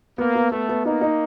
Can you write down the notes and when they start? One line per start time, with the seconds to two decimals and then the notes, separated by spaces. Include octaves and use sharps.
0.18 A#3 B3
0.35 B3
0.51 A3 B3
0.69 B3
0.85 A#3 D#4
1.01 D#4